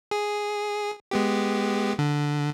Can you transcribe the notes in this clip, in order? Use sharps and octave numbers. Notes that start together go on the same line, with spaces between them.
G#4
G#3 B3 G4
D3